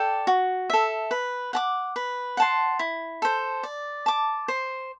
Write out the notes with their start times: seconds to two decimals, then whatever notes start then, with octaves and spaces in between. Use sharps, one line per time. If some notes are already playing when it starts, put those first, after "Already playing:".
Already playing: A4 D5 G5
0.27 F#4
0.70 A4 E5
1.11 B4
1.53 F#5 A5 D6
1.96 B4
2.37 F#5 A5 C6
2.79 E4
3.22 A4 C5
3.63 D5
4.06 A5 D6
4.48 C5